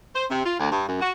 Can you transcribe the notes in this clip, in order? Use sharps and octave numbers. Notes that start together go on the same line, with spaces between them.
C5
C3
F4
D2
G2
F#2
F#4